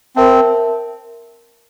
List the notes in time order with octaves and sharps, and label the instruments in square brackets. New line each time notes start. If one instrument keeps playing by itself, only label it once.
[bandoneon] C4 [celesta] A#4 E5 A5